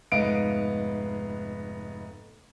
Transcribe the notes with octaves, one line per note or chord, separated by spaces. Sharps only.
F1 G#2 B3 D#5 F5 D7